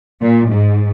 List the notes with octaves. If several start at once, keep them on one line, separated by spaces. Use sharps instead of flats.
A#2
G#2